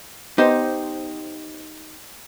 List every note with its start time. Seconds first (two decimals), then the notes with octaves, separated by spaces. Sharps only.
0.38 B3 D#4 G4 C5